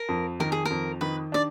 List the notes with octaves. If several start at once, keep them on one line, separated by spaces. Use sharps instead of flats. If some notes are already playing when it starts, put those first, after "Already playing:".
Already playing: A#4
F2
D#3 A#4
G#4
F2 A#4
D#3 B4
D4 D5